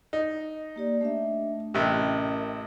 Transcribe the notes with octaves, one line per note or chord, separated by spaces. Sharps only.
D#4
A#3 G4 D5
A3 D4 E5
A1 C3 C#4 A#4 D#5